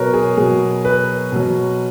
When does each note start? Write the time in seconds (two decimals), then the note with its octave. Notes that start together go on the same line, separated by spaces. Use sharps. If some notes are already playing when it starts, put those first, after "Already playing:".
Already playing: B2 F#3 A#4 B4 C#5
0.14 G#4
0.37 B2 F#3 G#4
0.85 B4
1.32 B2 F#3